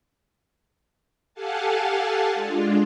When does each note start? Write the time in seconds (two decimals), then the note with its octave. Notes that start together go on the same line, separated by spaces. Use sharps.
1.34 G4 A4 F5 F#5 G#5 A5
2.34 G#3 D4 F4